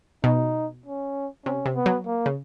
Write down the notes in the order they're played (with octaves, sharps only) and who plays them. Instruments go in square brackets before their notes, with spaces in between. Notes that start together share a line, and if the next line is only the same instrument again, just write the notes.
[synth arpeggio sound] B2 [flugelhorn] D#4
[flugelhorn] C#4
[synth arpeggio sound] C3 [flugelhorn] C#4
[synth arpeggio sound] C3
[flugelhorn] B3
[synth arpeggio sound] F#3
[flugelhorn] A#3
[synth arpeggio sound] C#3